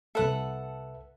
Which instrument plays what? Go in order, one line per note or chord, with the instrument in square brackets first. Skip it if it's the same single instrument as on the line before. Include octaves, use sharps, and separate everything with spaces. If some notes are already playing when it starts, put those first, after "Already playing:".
[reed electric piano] C2 B4 E5 [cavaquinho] A4 F#5